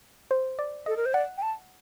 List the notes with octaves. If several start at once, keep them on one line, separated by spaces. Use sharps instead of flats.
C5
D5
A4 D#5
A#4
C5
D5 F#5
G5
A5